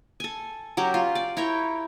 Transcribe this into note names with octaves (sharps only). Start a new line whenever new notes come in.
A4 G#5
F#3 C#4 G4 A#4
F4
D5
E4 A#4 C#5 G5